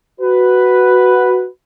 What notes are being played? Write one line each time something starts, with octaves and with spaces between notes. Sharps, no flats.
F#4 B4